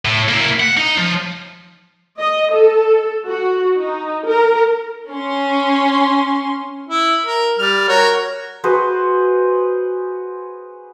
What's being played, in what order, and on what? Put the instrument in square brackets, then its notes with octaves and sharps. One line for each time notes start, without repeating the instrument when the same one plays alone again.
[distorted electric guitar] A2
A#3 E4
F#5
D#4
F3
[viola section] D#5
A4
F#4
D#4
A#4
[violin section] C#4 C6
[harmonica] E4
A#4
G3 F6
F#4 A#4 C#5
[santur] F#4 G#4 B4 C5